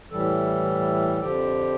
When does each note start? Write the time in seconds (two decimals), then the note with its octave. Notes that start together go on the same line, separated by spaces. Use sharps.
0.11 A2 E3 G3 A4
1.20 F2 D3 F3 G4